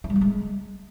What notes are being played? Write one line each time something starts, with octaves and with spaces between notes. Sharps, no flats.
E4
G3
A#3
G#3